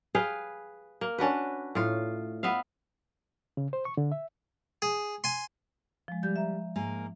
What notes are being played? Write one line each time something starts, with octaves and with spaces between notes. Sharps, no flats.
G#4 B4 F5 G5
A#3
C#4 D4 F#4 B4
A2 F4
B3 E5 F5
C#3
C5
C#6
D3
E5
G#4
G#5 C6
F3 G#3
G3 G6
E5 A#5
G#2 A#3 G#5